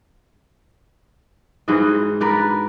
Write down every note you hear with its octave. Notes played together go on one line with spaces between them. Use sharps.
G#2 E3 F#4 D#5
D4 F#4 A#4 B4